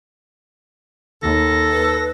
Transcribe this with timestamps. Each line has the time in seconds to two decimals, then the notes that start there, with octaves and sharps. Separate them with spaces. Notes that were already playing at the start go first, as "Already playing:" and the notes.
1.22 D#2 A4 A#6
1.72 B4